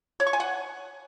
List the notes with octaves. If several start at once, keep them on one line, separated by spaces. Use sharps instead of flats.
C#5
C#6
G#5
F#5